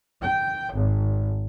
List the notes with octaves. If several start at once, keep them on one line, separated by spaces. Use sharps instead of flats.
G5
G#1